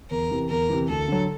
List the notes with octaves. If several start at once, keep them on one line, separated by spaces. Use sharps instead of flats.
E2 A#4
C3 E3
E2 A#4
C3 E3
D2 A4
D3 F#3